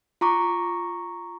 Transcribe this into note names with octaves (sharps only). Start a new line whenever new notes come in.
F4 A#5 C#6 D6